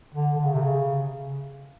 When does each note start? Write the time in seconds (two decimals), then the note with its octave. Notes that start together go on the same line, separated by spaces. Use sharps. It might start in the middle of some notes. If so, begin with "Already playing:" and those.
0.15 D3
0.37 D3
0.45 C#3
0.54 C3
0.61 C#3